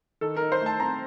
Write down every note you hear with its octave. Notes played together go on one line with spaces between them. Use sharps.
D#3 A4
A#4
D#4
C5
A3 A5
C4 A#5